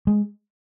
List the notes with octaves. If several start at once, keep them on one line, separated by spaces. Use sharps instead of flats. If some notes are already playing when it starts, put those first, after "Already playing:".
G#3